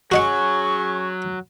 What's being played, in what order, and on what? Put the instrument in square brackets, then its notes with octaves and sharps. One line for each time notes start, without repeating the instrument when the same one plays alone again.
[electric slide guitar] F#3 [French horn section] C#4 G#4 [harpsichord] F#4 D#5 F#5 [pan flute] C#6